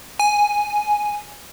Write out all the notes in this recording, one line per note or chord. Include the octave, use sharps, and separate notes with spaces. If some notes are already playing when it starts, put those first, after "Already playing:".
G#5